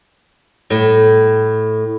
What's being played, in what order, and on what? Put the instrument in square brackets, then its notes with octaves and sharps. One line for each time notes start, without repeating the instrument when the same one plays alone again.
[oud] A2